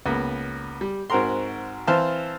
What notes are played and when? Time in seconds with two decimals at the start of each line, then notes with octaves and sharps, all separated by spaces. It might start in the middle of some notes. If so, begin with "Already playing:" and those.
0.06 C#2 A#3 B3
0.81 G3
1.10 G#2 C4 F#4 A#4 A#5 C6
1.87 E3 C4 C5 F5 A5 F6